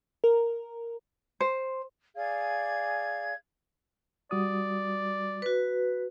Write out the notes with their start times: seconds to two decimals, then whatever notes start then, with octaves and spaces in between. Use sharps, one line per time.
0.24 A#4
1.40 C5
2.15 G#4 D5 F5 G#6
4.31 G3 F#4 D5 D#6
5.42 F#4 B4